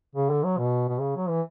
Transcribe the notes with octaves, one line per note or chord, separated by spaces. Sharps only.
C#3
D3
F#3
B2
B2
C#3
F#3
E3